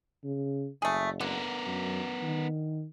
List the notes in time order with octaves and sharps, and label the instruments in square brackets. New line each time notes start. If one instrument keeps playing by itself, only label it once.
[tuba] C#3
[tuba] F#1 [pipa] A3 G#4
[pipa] D3 [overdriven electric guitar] B3 A#4
[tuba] F#2
D#3